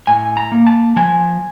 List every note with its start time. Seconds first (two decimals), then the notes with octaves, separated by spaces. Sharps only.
0.07 A2 G#5
0.37 A#5
0.52 A#3
0.67 A5
0.96 F3 G#5